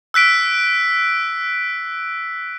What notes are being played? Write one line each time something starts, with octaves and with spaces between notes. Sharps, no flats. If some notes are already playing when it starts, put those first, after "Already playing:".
E6 F#6 B6 D7